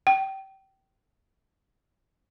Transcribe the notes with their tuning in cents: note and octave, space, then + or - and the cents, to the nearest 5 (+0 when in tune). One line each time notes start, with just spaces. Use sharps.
G5 -25